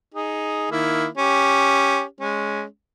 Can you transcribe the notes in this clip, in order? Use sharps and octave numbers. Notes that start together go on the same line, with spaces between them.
D#4 G#4
D#3 A#3 E4
C#4 G4
G#3 C#4